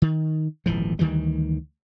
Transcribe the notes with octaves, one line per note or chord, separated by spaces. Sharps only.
D#3
D#1 G#1 E3 F3
D2 D#3 E3 G3